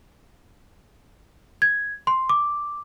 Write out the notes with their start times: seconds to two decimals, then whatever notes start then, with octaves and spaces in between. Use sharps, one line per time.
1.62 G#6
2.07 C6
2.29 D6